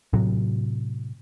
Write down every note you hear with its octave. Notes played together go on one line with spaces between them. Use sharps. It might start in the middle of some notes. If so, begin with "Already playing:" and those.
A2 C3 F#3